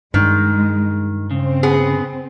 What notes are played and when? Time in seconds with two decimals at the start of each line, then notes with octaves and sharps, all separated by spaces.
0.14 G2 D#3 G#3
1.31 C#3 C4
1.63 B3 G#4